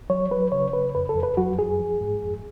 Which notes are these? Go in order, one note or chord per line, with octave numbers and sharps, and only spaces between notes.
F#3 C#5
F#3 B4
C#3 C#5
C#3 B4
F2 B4
A4
F2
B4
F#3 F#4
F#2 G#4
F3
G#2
F2